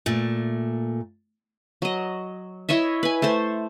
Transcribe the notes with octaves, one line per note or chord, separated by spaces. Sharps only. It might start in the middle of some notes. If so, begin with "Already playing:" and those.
A#2 A3
F#3 D#5
E4 C#5 D#5 E5
B4 G#5
A3 A4 C5 C6